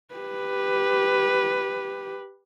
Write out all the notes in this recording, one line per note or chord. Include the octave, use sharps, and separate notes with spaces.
G4 B4